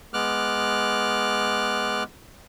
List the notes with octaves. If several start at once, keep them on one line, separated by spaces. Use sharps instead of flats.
G#3 B3 D6 F6 F#6